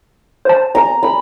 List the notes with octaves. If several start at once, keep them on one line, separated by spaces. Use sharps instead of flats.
C5 A5
A#5
B5